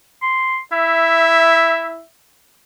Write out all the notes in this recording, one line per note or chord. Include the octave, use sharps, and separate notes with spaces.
C6
E4 E5